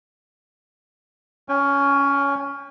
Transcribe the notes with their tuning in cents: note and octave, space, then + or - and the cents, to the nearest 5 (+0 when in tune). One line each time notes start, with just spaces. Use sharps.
C#4 +15 G#5 -45